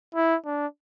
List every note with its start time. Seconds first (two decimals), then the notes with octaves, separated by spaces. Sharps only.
0.15 E4
0.45 D4